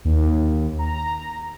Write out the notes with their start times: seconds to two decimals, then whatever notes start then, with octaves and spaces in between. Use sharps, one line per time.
0.05 D#2
0.79 A#5